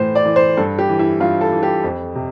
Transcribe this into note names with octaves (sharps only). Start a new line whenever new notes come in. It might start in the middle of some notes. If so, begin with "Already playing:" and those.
Already playing: A2 E3 C5
D5
E3
C5
G2 A4
G4
E3
E4
G2 F4
A4
E3
G4
F2
C3